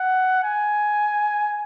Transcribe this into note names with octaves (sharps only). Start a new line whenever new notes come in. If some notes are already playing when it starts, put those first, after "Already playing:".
Already playing: F#5
G#5